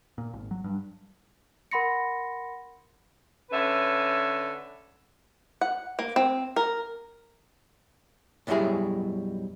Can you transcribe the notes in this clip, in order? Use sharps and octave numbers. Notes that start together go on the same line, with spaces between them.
A#2
G#1
F#3
G2
A#4 F#5 B5 C6 A#6 C#7
D3 C#4 B4 E5
F#5
A#3
C4
A#4
B1 F#2 F#3 G3 E4 G#4